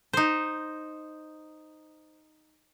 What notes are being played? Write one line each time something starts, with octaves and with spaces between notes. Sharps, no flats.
D#4 C5